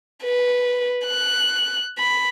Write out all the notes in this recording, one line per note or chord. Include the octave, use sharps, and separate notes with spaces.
B4
F#6
B5